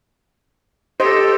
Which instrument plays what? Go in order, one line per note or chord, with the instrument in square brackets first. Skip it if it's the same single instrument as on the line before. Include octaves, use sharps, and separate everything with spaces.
[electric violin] G4 A4 [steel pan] C5 D#5